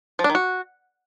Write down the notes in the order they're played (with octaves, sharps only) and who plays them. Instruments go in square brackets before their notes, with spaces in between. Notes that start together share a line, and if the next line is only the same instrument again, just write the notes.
[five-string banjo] F3
D4
D#3
F#4